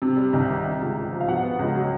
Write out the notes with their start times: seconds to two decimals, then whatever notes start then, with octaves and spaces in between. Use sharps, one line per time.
0.02 C3
0.17 G3
0.33 C2
0.49 D#3
0.65 C3
0.81 C#2
0.97 C#2
1.12 F3
1.21 F5
1.28 B2 F#5
1.43 B3
1.59 C#2
1.75 F#3